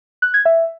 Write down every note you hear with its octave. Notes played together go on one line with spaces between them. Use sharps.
F#6
G#6
E5